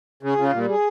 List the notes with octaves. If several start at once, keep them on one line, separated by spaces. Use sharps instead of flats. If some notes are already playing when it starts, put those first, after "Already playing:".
C#3 G#4
C#3 F4
A#2 G3
G#4